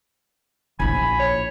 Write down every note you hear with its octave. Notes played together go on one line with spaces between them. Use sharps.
A#1 E4 G#5 B5
C#5